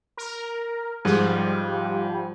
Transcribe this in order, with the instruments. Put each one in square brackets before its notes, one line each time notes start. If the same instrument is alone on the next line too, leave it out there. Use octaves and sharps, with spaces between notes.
[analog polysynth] A#4
[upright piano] G#2 [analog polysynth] F3 G3